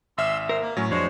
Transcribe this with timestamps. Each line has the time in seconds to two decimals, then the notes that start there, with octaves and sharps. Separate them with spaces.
0.18 G#1 E5 C6 E6 F6
0.49 A#4 C5
0.61 A#3
0.77 A2 F#3 C#4
0.90 F2 G#3 D4 C5 C#5